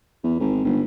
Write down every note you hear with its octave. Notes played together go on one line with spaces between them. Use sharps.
E2
G#1
G1